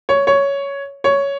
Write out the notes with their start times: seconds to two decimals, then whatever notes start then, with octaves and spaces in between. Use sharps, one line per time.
0.09 C#5
0.27 C#5
1.04 C#5